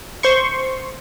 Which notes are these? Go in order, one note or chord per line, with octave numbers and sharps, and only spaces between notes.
C5 C6 C#6